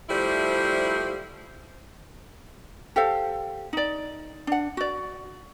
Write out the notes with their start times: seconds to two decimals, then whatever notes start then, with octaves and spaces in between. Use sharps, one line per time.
0.10 F3 G3 A3 E4 C5 D5
2.96 G4 A4 C5 F5
3.73 D#4 D5
4.47 D4 F#5
4.77 F#4 D5